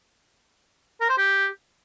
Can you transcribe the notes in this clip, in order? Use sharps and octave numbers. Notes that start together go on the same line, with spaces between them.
A#4
C5
G4